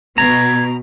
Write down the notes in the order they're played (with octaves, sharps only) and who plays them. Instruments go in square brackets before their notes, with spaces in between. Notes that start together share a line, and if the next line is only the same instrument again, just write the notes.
[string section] B2 [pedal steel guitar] A#5 [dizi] G#6